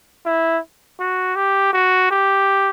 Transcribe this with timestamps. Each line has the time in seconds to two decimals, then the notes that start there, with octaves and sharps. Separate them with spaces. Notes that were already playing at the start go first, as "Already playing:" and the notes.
0.25 E4
1.00 F#4
1.36 G4
1.73 F#4
2.11 G4